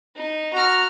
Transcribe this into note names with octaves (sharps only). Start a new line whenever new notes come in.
D#4
F#4 A#5 F6